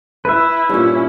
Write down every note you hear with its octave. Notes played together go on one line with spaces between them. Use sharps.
E4 B4 E5
G2 A#2 C#4 E4